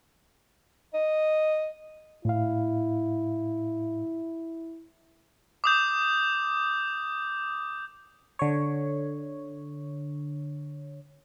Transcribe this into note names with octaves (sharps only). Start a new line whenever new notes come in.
D#5
A2 E4 F5
D6 D#6 G6
D3 C#5